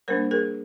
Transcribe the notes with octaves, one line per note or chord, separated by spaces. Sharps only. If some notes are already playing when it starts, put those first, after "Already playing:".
G3 A#3 D4 A#4 C5
G#4 A#4